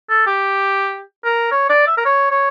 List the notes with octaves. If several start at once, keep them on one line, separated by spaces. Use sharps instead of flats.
A4
G4
A#4
C#5
D5
E5
A#4
C#5
C#5